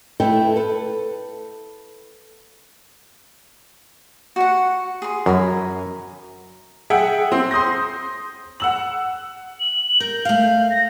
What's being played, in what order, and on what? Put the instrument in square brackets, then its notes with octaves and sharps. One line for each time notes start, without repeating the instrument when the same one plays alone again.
[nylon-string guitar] A3 E4 A4 B4 G5 A5
A4 B4
[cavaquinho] F#4 F#5
G#4 C6
[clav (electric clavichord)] F#2 [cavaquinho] A#4 G#5 B5
[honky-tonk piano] G#4 E5 F#5 G5
C4
C6 D#6 G6 A#6
F#5 E6 F#7
[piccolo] F#7
[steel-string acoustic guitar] A#4 [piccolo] G6
[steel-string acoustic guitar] A3 F5
[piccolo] A#6